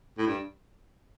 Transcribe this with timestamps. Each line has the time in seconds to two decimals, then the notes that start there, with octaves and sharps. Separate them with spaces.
0.18 A2
0.27 G2